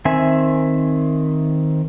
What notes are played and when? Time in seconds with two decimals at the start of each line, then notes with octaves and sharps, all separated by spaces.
0.05 D#3 C4 E5 G#5